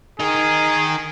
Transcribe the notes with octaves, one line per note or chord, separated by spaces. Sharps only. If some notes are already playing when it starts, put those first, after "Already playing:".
D#4 G#4 A#4